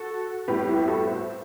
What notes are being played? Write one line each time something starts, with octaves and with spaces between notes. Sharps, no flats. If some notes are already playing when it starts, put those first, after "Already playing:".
Already playing: F#4 A4
A2 G3 B3 G4 B4
E4 G4
F#4 A4
C5 E5